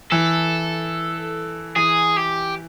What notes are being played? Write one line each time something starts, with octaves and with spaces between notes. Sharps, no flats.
E3 A4
E3 G#4
G4